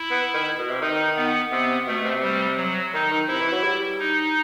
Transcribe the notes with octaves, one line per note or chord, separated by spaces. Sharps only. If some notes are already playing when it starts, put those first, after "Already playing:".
Already playing: E4
B3
D#3
B2
C3
D#3 D#4
B3
C3 B3
B2 A3
C3
G3
F#3
D#3 D#4
D#3
C3 E4
E3
F#3
G3
D#4